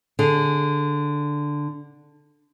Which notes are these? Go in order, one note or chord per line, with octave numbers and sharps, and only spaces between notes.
D3 G#4